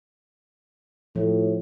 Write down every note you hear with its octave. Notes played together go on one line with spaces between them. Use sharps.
A2 F3